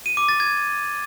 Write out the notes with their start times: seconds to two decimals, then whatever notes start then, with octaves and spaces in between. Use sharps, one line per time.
0.06 D#7
0.17 D6
0.29 A6
0.40 G#6